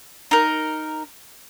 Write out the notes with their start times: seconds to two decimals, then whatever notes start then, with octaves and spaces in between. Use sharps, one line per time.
0.31 D#4 A#4